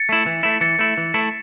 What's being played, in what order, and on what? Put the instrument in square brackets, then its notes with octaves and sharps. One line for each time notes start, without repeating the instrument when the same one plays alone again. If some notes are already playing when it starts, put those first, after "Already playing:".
Already playing: [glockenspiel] A6 C#7
[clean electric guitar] A3 E4
E3
A3 E4
[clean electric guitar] E3 [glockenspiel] A6 C#7
[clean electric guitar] A3 E4
E3
A3 E4